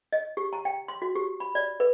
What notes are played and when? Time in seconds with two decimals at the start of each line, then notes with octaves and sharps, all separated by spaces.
0.12 D#5
0.37 G4
0.53 A#5
0.65 G5
0.88 C6
1.02 F#4
1.15 G4
1.40 B5
1.55 D5
1.80 B4